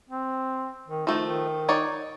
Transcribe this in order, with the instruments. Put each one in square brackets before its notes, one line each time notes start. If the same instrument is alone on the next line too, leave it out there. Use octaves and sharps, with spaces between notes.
[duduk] C4
D#3
[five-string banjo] F3 A3 [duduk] D#4
[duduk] D#3
[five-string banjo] D#4 C#5 D5